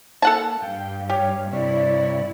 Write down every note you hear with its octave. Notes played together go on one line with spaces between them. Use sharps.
A#3 A4 F#5 A5
G2 F5 G5
G4 C#5 F5
G2 C3 E4 C#5 D5